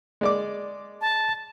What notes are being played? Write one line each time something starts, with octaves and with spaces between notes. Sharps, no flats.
G#3 D5 D6
A5